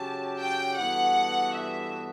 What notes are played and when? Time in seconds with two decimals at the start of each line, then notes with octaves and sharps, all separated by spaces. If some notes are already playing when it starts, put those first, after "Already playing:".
Already playing: C#3 F#3 C#4 G4 A5
0.40 G5
0.79 G2 E3 B3 F#4 A4 F#5
1.55 E5